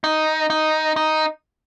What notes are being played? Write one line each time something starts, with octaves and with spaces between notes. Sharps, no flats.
D#4
D#4
D#4